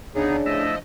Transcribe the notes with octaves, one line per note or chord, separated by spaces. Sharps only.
D2 C#3 B3 D4 D#4 G#4
F3 A3 E4 D#5 E5